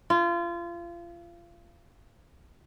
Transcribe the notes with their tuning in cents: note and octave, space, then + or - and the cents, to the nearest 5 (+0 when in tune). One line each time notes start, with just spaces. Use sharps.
F4 -30